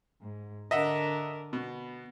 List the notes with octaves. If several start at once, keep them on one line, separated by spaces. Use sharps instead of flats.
G#2
D3 D4 A#4 D#5 E5 F#5
B2 B3